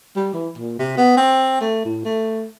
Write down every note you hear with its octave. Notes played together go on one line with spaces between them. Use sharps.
G3
E3
A#2
C3
B3
C4
A3
A2
A3